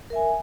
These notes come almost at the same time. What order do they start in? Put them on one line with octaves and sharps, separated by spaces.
A#4 E5 G#5